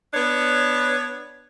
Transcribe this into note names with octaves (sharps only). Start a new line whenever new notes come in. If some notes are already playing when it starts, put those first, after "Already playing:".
B3 D4 C#5